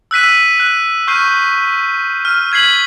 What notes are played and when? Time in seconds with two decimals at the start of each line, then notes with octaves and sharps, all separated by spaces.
0.11 E6 F#6 B6 D#7
0.60 F#6
1.08 C#6 F6 G6 C7
2.25 F6
2.52 F6 G#6 B6 C7 F#7